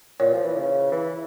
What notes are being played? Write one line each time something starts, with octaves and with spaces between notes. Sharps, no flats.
A#2 C#5
F3
E3
C#3
E3